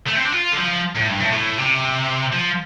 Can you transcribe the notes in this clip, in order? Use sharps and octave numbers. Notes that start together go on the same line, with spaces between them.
A3
C4
D4
F4
D3
F3
A2
G2
A2
A2
C3
F3